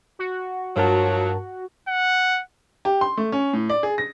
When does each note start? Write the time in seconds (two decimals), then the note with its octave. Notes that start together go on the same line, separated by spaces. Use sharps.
0.19 F#4
0.77 G2 F3 F#3 A#4 A5
1.88 F#5
2.85 G4
3.01 C6
3.17 A3
3.32 C#4
3.53 A2
3.70 D5
3.83 G#4
3.98 A#6